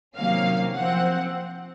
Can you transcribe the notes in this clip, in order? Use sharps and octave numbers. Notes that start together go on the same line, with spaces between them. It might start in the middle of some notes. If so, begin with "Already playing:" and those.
C3 D#3 F#3 A#3 C#4 F5
F3 C4 F#5